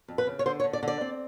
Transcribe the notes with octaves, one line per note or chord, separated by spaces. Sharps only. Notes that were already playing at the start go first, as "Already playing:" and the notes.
F2
B4
C#3
C#5
D3 C5
C#5
D3
D5
D3
D5
C4